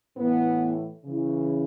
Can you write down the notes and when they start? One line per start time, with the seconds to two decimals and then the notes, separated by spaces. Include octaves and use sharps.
0.16 A2 E3 B3
1.04 C#3 E3